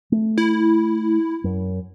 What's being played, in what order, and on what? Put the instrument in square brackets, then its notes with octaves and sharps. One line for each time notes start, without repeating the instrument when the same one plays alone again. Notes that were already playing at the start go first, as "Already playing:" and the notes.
[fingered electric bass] A3
[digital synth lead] E4
[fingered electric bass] F#2